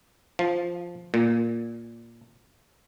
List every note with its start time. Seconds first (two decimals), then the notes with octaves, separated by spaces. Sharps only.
0.39 F3
1.14 A#2